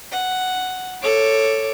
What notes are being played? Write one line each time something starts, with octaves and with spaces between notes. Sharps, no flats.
F#5
A4 C#5 D6